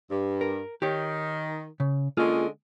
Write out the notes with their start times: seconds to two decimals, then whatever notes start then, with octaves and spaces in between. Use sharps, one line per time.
0.11 G2
0.41 A#4
0.82 D#3 G4 C#5
1.80 C#3
2.17 D3 G#3 A#3 C#4 F4 G#4